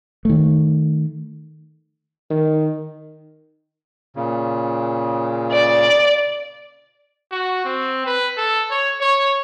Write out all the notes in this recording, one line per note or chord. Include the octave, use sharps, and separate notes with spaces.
D#3 A3
D#3
A#2 C#3
D5
F#4
C4
B4
A4
C#5
C#5